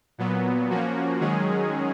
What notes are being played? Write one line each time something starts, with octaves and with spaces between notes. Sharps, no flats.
A#2 F#3 B3
F3 A#3 C#4 F#4
D#3 F#3 G#3 C#4 G#4